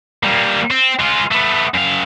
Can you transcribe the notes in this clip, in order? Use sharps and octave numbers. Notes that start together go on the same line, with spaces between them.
G3 A#3
C4
G#3 F4
A3 B3
F#2 F5